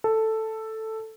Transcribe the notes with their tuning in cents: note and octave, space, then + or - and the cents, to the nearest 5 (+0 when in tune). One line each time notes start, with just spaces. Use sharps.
A4 +5